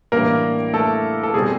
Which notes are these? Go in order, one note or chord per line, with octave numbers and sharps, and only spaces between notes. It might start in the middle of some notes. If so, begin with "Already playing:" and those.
A2 E3 G3 A#3 D4 A#4
A3 A4
A4
B2 G3 C4 G#4